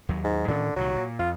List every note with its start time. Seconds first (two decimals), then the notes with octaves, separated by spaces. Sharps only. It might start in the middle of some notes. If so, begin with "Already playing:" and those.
0.09 D#2 F#3
0.24 G#2
0.48 A2 D3 D#3 C#4
0.76 C2 A#2 D#3 F#3
0.96 A#2
1.19 F2 F4